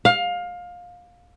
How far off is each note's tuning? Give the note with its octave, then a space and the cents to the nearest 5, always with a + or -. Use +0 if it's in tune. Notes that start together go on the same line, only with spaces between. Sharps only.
F5 +20